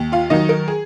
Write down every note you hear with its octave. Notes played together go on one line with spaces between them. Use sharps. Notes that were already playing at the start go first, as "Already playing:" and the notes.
Already playing: D#2
F4 F5
D#3 F#3 D#4 D#5
A#4
G#4